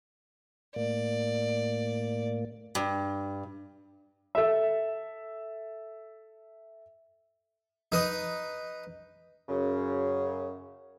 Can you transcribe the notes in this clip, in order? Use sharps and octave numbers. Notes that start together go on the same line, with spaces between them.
A2 A#3 D5
G2
A4 E5
D#4 B4 D#6
F#2 C#3